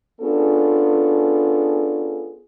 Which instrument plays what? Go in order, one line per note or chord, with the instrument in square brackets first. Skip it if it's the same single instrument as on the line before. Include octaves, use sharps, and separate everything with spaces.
[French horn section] B3 C#4 D4 F4 G#4 A4